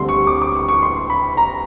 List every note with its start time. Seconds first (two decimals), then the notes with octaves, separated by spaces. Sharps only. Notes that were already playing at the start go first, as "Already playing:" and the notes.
Already playing: D2 D3 G3 C4 C6
0.09 C#6
0.27 D6
0.42 D6
0.55 C#6
0.68 C#6
0.82 C6
1.10 B5
1.37 A#5